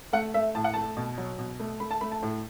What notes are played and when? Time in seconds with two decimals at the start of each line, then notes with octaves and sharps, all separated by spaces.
0.13 A3 F#5
0.34 A3 E5
0.55 A2 A5
0.64 F#5
0.74 A3 A5
0.97 B2
1.18 F#3
1.39 B2
1.60 A3
1.80 A3 B5
1.91 A5
2.01 A3 B5
2.12 A5
2.23 A2